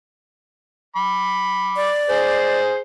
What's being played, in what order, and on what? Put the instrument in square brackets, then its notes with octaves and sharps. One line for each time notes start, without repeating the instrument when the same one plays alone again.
[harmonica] B5 D6
[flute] D5
[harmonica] G#4 C5